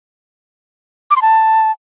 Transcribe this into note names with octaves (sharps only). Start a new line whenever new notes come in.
D6
C6
A5